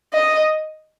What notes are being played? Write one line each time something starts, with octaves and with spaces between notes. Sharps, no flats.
D#5